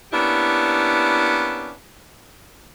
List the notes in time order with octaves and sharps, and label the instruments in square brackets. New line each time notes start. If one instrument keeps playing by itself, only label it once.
[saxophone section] A#3 B3 C#4 D4 E4 G4